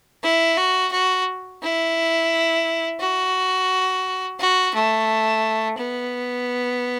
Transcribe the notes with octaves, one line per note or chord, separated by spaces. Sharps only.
E4
F#4
F#4
E4
F#4
F#4
A3
B3